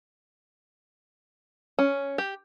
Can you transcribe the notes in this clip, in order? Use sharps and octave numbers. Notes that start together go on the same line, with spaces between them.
C#4
G4